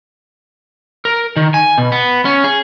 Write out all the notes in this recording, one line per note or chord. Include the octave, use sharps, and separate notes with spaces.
A#4
D#3
G#5
B2
B3
C#4
G#4